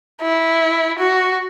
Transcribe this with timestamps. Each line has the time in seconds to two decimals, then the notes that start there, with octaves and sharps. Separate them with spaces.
0.22 E4
0.99 F#4